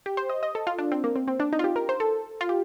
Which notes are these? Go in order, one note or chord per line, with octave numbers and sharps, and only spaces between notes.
G4
C5
D#5
D#5
A4
F4
D4
C4
A#3
C4
C4
D4
D#4
F4
G4
A#4
C5
A4
F4
G4